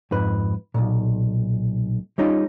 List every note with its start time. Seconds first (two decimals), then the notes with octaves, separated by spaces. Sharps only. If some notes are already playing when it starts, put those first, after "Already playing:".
0.11 F2 G#2 B4
0.74 B1 F#2 A#2
2.18 G3 C#4 D#4 F4